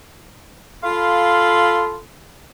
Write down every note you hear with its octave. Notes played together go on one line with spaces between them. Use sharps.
F4 A4 F5 B5 C6